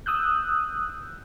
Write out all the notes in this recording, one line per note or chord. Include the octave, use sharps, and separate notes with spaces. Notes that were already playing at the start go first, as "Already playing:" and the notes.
D#6 E6 F#6 G6